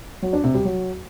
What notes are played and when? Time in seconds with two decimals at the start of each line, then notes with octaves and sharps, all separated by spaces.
0.22 F#3
0.33 D4
0.44 C3
0.54 G3
0.65 F#3